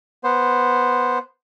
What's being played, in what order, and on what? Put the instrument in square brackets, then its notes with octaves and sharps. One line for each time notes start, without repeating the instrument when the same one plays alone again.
[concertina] B3 C5